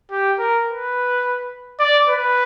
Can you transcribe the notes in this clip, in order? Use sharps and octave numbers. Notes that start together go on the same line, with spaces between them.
G4
A#4
B4
D5
B4